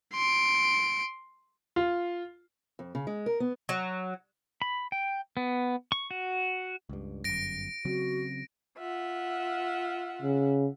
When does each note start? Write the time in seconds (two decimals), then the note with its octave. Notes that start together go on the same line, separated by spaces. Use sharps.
0.13 C6 D7
1.76 F4
2.79 F2
2.95 C#3
3.07 G#3
3.26 A#4
3.40 B3
3.69 F#3
4.62 B5
4.92 G5
5.37 B3
5.92 C#6
6.11 F#4
6.89 C#2 G2
7.24 G1 F#2 A#6 D7
7.85 C#3 F#3 C4 F#4
8.77 F4 E5 F#5
10.22 C#3